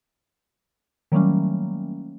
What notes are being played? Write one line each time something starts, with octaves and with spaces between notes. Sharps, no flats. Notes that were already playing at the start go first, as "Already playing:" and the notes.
D#3 F#3 G3 A3 A#3 C#4